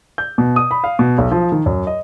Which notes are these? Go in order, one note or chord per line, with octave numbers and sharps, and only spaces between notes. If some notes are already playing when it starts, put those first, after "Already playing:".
G6
B2
D#6
B5
F5
B2
B1
F3
D#3
F#2
D#5